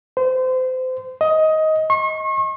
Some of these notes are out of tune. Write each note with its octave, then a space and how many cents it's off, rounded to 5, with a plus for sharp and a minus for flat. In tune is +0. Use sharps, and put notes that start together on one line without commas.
C5 -30
D#5 +15
C#6 -40